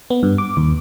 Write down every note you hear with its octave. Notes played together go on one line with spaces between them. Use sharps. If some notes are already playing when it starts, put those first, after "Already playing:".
B3
G2
D6
D#2